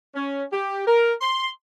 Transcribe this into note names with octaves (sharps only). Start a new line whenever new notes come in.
C#4
G4
A#4
C6